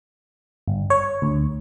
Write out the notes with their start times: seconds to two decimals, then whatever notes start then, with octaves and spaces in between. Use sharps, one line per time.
0.68 G1
0.90 C#5
1.22 D2